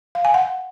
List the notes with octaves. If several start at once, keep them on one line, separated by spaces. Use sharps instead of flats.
F5
G#5
F#5